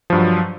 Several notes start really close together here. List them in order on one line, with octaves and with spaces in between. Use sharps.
F3 G2 F#3